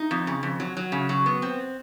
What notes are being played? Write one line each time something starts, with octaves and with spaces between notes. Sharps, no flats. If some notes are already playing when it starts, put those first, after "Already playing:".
Already playing: D#4
F2
C#3
F2
F#3
F#3
C#3
F#3
B3
C4